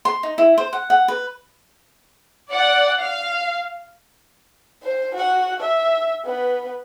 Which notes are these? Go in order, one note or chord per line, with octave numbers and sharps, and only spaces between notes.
C6
D#4
E4
C5
F#5
F#5
B4
D5 F#5
F5
C5
F#4 F#5
E5
B3 B4